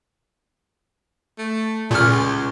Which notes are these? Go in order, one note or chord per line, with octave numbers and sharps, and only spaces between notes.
A3
C#2 A#2 F6